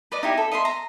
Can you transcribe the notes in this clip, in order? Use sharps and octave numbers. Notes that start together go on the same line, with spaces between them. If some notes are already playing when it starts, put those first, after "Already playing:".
B4 D5 D#5
D#4 E4 G4
A4
D#5 E5 A#5 C6
A#5